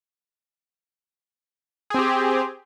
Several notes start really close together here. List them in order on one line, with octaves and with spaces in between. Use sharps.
G#4 C4 G4